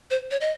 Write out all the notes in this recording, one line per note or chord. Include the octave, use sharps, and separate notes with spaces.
C5
C#5
D#5